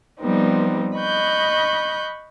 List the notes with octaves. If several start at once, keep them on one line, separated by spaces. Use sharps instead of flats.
F3 G3 B3 C4 D#4
D#5 B5 C#6 F#6 G6